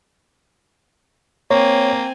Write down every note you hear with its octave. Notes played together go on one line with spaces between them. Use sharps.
A#3 C4 C#5 G#5